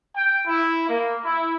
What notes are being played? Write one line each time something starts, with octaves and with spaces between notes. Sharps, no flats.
G5
E4
A#3
E4